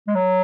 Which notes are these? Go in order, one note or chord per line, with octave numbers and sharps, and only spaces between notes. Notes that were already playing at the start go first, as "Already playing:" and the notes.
G#3
F#3